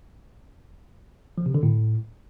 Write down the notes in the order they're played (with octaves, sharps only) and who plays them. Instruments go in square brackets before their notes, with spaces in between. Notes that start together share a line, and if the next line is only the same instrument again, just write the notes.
[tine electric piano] F3
C3
D3
A2